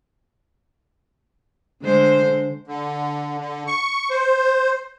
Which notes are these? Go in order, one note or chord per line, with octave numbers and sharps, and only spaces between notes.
D3 G#3 C5
D3
D3
C#6
C5